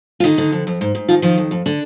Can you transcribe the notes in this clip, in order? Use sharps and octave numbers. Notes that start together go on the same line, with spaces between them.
F4
D3 D#3 D#4
D3
F2
F2
G#2
G#2
D#3 F3 F4
D#3 F3 F4
F2
F2
D3 D4